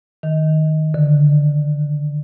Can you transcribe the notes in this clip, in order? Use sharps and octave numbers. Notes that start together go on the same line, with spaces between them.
D#3
D3